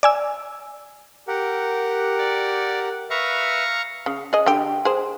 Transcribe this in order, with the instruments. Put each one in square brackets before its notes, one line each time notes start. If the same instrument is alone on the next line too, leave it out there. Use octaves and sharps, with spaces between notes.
[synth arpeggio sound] D5 G#5 E6
[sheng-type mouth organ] G4 A#4 F#5
[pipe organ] D5
[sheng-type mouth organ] B4 E5 [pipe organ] F5 A#5 C#6
[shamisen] C#3
G#4 D#5
D3 G4
G#4 C5